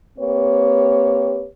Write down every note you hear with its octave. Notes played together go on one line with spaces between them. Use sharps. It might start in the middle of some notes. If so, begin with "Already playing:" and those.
A#3 C4 G4 B4 C#5